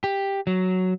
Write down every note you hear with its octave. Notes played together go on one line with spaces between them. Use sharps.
G4
F#3